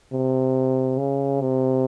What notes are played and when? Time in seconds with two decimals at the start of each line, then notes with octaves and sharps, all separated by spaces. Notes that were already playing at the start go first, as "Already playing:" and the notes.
0.13 C3
0.98 C#3
1.41 C3